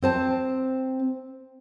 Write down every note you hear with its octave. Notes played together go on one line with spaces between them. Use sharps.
C4 C5 A5